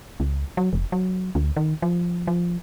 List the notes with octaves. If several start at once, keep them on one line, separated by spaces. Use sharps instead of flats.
C#2
F#3
F1
F#3
D2
D#3
F3
F3